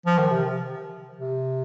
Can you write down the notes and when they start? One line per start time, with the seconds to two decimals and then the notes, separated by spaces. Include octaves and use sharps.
0.06 F3
0.19 D#3
0.30 C3
1.16 C3